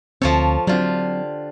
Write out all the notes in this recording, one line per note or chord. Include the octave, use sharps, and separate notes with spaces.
D2 F3 C4 A4 C#5
D3 F#3 C4 F4 G4